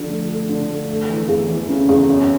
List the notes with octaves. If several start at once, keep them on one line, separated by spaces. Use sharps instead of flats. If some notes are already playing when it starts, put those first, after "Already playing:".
Already playing: D3 F3
A3
A3
D3
A3
A3
E3
E2
E3
C#3
E2
F#2